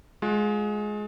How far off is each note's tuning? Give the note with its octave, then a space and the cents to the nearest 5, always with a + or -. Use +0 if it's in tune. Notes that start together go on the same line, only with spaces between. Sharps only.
G#3 +15 F4 +35